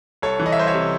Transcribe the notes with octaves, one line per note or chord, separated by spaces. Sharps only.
C2 A4 C#5
E3
D#5
E5
C2 C5 D#5
C#5 E5
C3